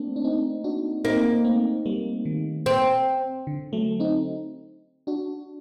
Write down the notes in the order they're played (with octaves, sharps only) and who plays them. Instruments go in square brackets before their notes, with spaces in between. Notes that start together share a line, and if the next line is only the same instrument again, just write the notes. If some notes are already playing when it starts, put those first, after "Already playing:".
Already playing: [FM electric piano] A3 A#3 C4 D4
D4
C4 D#4
D4 F#4
[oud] A#3 [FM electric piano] C4 D#4
[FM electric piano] A3 C4
G3 A#3
D#3
[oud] C4
[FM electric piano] D3
F#3 A3
C4 D#4
D4 F#4